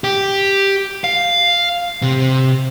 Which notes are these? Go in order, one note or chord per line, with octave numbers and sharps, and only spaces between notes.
G4
F5
C3